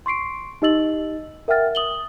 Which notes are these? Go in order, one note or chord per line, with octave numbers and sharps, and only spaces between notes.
C6 C#6 C7 D7
D#4 G4 D#5 E6 A6 F#7
A#4 E5 F#5 G5 F6 A6
D#6 F#7 G7